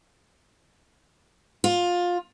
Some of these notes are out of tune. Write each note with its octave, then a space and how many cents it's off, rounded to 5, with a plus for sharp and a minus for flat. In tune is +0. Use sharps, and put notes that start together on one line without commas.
F4 +15